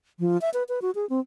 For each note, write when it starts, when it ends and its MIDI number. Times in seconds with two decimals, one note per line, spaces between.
0.19 0.40 53
0.41 0.50 76
0.54 0.63 71
0.69 0.80 71
0.82 0.91 66
0.95 1.08 68
1.10 1.20 60